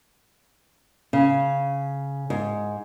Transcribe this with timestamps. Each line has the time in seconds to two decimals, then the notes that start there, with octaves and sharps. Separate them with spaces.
1.13 C#3
2.30 G#2